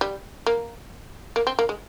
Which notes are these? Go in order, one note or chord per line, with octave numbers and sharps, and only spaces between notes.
G3
A#3
A#3
C4
A#3
G#3